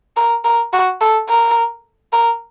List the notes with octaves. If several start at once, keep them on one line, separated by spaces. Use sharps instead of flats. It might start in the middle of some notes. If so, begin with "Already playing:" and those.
A#4
A#4
F#4
A4
A#4
A#4